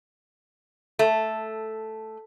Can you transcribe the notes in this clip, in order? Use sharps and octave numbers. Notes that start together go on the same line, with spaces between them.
A3